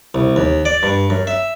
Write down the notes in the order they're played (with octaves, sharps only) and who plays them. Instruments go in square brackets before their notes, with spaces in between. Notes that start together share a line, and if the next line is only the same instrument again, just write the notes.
[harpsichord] C2
D#2
D5
G2
F#2
E5